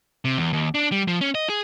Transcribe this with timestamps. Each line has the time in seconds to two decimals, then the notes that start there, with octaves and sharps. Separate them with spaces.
0.25 C3
0.37 E2
0.53 D#2
0.74 D4
0.92 G3
1.08 F3
1.21 C#4
1.35 D#5
1.49 G#4